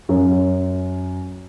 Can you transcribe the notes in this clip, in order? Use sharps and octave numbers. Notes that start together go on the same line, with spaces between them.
F#2